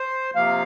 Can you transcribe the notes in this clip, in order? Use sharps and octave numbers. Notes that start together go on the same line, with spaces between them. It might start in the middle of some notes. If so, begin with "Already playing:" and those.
Already playing: C5
C3 F3 A#3 F5